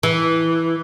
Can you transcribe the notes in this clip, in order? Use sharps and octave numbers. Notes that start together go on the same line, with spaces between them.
E3